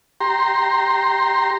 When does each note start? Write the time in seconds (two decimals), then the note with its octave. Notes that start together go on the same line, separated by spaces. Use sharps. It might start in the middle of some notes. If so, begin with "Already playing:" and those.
0.20 G4 A#5 C6